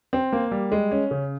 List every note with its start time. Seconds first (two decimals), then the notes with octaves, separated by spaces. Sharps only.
0.13 C4
0.33 A#3
0.51 G3
0.72 G#3
0.91 C#4
1.11 C#3